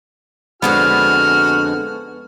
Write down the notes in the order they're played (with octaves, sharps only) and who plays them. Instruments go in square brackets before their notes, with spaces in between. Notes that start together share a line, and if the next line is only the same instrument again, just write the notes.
[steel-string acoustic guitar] F2 D3 G#3 [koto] B3 [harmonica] F#4 G#5 F6